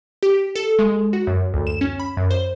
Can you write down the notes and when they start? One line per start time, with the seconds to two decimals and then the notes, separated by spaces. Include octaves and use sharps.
0.23 G4
0.55 A4
0.79 G#3
1.13 F#4
1.27 F#2
1.54 D2
1.67 E7
1.81 C#4
2.00 B5
2.17 F#2
2.31 C5